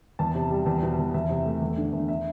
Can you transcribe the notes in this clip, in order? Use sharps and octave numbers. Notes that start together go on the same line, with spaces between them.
E2 A5
C3
G3
E2
B2
E2
E2 E5
C3
A3
E2
D3
E2
E5